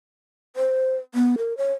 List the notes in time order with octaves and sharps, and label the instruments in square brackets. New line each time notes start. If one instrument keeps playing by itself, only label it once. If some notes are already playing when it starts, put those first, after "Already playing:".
[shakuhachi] C5
B3
A#4
C#5